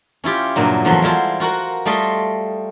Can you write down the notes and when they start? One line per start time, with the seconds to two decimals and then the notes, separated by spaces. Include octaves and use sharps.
0.24 C#4 E4 F4 G4
0.56 G2 A#2 C#3 F#3
0.85 E2 F3 F#3 A3 C6
1.02 G3 G#3 E4 F4 C5
1.40 F4 F#4 A#4 F#5
1.85 G3 A3 F4 D#5 C6